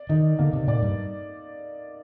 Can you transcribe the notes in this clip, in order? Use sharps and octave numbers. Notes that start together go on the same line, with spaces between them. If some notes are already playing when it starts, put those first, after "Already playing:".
Already playing: D5
D#3 D#4
D3 A#3
C3
A#2 D5
G2